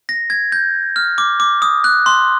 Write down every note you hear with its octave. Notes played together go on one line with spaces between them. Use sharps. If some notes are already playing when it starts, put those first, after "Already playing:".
A#6
G#6
G6
F6
D6
D6
D#6
F#6
C6